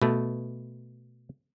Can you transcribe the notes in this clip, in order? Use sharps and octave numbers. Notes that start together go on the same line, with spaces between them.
B2 A3